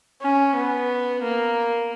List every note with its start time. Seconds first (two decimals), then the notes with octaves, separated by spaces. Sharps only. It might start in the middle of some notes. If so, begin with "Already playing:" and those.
0.22 C#4
0.55 B3
1.22 A#3